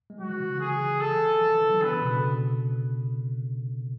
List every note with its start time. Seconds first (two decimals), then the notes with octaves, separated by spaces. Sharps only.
0.10 G#3
0.20 F#3 F#4
0.30 E3
0.40 C#3
0.50 D3
0.60 G#4
1.00 A4
1.41 E3
1.52 E3
1.61 D3
1.71 F#3
1.81 D3 B3
1.91 C#3
2.02 B2
2.12 D3